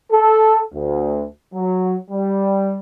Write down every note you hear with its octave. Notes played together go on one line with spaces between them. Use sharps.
A4
D2
F#3
G3